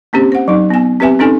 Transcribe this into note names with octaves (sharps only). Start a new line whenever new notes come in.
A#3 C4 C#4 G4 C5
C5 F#5
F#3 D#4
B3 G#5
C4 G4 B4 E5 G#5
C4 C#4 D#4 A4 G#5